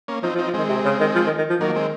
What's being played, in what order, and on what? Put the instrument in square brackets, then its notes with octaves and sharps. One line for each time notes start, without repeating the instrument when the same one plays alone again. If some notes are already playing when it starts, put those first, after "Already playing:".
[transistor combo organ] A#3 C#4
[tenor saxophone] F3 [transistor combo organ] C4 D#4
[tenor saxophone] F3
[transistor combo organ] C4 D#4
[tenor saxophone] F3
[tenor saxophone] D#3 [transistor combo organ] G#3 C4
[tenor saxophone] C3
C#3
D#3
F3
D#3
D#3
F3
[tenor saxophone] D#3 [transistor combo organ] F#3 A#3
[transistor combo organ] G#3 C4